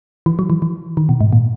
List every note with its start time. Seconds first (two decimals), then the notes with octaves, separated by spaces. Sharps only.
0.26 E3
0.39 F#3
0.50 E3
0.62 E3
0.97 D#3
1.09 B2
1.21 G#2
1.33 A#2